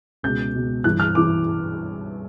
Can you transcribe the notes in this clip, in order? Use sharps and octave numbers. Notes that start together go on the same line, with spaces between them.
C#2 B2 G6
C#2 B2
G2 E3 F#6
F6
E3 D6